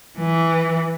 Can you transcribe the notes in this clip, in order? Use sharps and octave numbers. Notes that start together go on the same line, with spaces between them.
E3